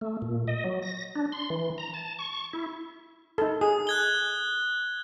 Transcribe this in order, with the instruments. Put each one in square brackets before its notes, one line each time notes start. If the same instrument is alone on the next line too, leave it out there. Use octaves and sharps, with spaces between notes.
[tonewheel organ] A3
A#2
D#5
F#3
A#6
D4
C6
E3
A#5
A5
C#6
E4
[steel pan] D#4 A4
[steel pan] G#4 [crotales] D#6
[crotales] F#6 G#6 G7